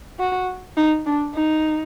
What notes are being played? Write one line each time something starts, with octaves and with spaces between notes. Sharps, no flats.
F#4
D#4
D4
D#4